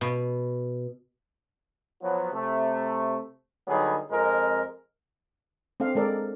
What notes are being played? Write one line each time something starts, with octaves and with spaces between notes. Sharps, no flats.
B2
F3 F#3 B3
C3 A3
D3 F#3 G3 B3 D#4 G#4
F2 G#3 A#4
C4 D4 A4 F5
G#3 D4 A4 A#4 D5